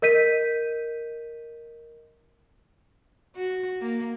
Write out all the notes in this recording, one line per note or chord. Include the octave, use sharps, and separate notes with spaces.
A#4 D#5 G6 B6 D#7
F#4
A#3